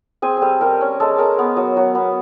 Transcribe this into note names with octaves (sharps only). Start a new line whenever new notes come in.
C4 G#4 G#5
G3 A4 G#5 A5
G3 A#4 A#5
C#4
G#3 A4 A5
G#3 A#4 A#5
B3
F#3
F#3
B3